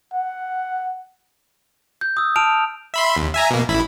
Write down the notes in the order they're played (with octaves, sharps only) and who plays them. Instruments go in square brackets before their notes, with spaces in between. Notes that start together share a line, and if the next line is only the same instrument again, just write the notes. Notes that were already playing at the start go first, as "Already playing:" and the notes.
[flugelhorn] F#5
[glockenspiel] G6
D#6 E6
A5 F6 D7 F7
[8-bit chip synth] E5 B5 C6
D#2
E5 G#5 A#5
B2 A#3
A1 E4 B5